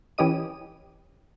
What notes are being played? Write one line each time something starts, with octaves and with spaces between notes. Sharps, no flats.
E3 C#4 G4 D#5 D#7